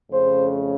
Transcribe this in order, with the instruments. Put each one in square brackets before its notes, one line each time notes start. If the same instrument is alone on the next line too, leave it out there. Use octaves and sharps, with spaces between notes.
[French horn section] F2 C#3 A3 C#4 C5